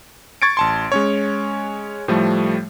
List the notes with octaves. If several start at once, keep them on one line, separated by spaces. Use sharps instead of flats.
C#6 G#6 A6 C#7 D7
A1 A5 C6
G#3 C#4 C#5
A2 F3 G3 A3